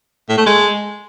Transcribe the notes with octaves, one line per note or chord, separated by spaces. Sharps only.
A2
A3
G#3